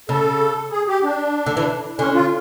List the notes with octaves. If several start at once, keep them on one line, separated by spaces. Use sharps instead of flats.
C#3 A4
G#4
G4
D4
D3
E3
D3 C#4
F4